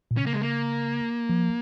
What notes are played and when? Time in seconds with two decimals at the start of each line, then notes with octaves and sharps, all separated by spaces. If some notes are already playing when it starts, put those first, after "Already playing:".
0.11 A#2
0.17 C#3 C#4
0.26 A#3
0.33 G#3
0.41 A#3
1.29 F3